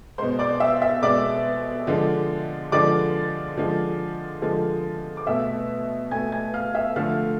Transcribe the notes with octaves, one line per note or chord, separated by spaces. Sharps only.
B2 G#3 C5 C6
D5 D6
E5 E6
E5 E6
B2 G#3 D5 D6
D3 F3 G#3
D3 F3 G#3 D5 D6
D3 F3 G#3
D3 F3 G#3
D6
B2 A3 E5 E6
B2 A3 G#5 G#6
G#5 G#6
F5 F6
E5 E6
D3 F3 A3 F5 F6